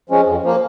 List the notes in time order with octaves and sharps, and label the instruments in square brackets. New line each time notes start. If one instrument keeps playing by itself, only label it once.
[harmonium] F3 G#3 C#4
F2
F3 A#3